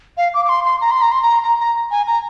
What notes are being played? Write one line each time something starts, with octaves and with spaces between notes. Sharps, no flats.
F5
D6
D6
C6
C6
A#5
C6
A#5
C6
A#5
A#5
A#5
G#5
A#5